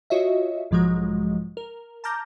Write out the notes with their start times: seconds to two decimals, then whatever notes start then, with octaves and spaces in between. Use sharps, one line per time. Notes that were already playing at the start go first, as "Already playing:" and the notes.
0.10 F4 F#4 C#5 D#5 E5
0.71 B1 G#2 F3 F#3 G#3
1.57 A#4
2.04 A5 A#5 D6 F6 G6 A#6